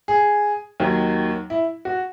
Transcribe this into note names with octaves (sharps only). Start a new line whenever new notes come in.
G#4
D#2 D#3 F#3
E4
F#4